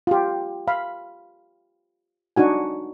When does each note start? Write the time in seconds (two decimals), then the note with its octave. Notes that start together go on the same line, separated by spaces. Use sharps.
0.07 F4 G4
0.68 F5 B5
2.36 D4 D#4 F#4 G#5